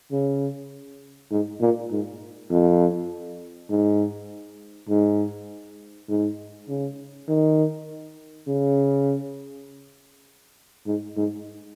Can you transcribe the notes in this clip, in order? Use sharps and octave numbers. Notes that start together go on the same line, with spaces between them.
C#3
G#2
A#2
G#2
F2
G#2
G#2
G#2
C#3
D#3
C#3
G#2
G#2